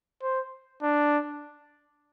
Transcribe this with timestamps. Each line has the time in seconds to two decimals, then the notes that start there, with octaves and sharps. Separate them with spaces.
0.22 C5
0.82 D4